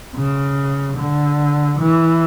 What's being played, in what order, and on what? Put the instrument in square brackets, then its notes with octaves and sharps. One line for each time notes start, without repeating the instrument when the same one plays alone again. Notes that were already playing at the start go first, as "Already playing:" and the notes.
[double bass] C#3
D3
E3